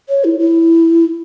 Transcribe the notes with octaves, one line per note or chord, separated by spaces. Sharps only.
C#5
E4
E4